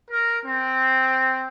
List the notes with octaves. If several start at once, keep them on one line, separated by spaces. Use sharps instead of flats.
A#4
C4